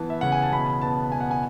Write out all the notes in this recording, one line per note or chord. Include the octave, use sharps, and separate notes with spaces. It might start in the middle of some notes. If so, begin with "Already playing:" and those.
Already playing: E3 B3 A5
E5
C#3 F#5
G#5
A5
B2 B5
B3 A5
B2 G#5
F#5
G#5